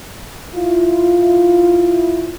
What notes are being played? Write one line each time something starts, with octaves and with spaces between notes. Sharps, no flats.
E4 F4